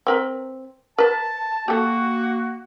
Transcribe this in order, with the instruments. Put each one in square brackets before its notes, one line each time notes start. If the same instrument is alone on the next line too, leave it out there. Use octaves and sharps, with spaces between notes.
[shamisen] C4 A#4 B4
[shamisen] A#4 B4 [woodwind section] A5
[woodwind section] A#3 F#4 [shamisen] G4 A4